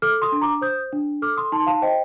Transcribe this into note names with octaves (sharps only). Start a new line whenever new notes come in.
A4 D6 F6
C6 D#6
D4
A#5 D6
C5 D#6 G6
D4
A4 D6 F6
C6 D#6
D#4 A5 C6
F5 A5
C5 D#5 G5